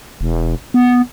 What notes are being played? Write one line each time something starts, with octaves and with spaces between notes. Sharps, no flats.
E1
B3